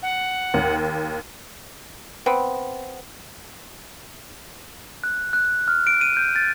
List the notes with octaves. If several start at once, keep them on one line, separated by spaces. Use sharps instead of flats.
F#5
D#2
B3 C4
F#6
F#6
F6
D7
D#7
G6
A6